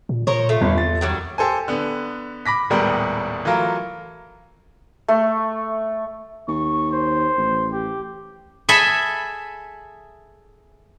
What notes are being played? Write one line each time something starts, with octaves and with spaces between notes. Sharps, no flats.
A#2
A#2 A#4 C5 C#5
A3 F4
G1 E2
A6
D#3 F#3 G3
G4 A4 C5 G#5
D3 B3
B5 D6 A#6 B6
D#1 A2 G3 G#3 B3 A#4
E3 F#3 A3 F4 A#4
A3
D#2 C#6
C5
A1
G4
G#4 A4 E5 G#5 B5